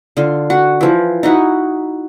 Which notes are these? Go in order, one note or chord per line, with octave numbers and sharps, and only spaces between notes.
D3 F4
F#4
E3 F3
D#4 E4 F#4